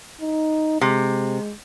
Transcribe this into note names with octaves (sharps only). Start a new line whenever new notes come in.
D#4
C3 G#3